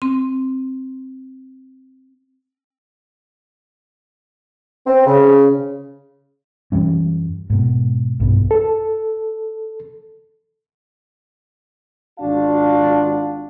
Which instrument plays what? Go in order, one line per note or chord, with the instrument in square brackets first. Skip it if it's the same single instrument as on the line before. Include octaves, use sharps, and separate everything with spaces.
[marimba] C4 C6
[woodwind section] C4
C#3
[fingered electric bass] F#2 E3 G3 C#4
G#2 B2
B1 G2 B3
[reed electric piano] A4
[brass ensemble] G#1 D4 F4 F#4 F5 A5